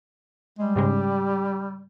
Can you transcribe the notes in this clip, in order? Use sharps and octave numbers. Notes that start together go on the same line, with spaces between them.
G3 G#3
G#2 C#3 G#3 G4